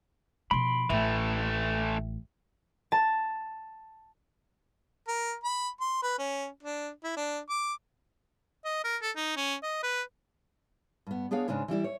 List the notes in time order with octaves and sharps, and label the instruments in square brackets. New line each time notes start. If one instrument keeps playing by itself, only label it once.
[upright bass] B2 F3 [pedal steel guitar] B5 C6 [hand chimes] D7
[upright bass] A1 [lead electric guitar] E3 A3 [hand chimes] E5 G5
[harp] A5
[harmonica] A#4
B5
C6
B4
C#4
D4
E4
D4
D6
[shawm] D#5
A#4
A4
D#4
C#4
D#5
B4
[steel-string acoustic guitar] G2 B3
B3 D4 G#4 C#5 F5
G#2 C#3 G#3 C#4 D4
E3 G3 E4 D5
C#5